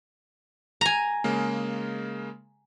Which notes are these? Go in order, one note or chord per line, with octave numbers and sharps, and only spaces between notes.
G#5 A#5
C#3 G#3 A#3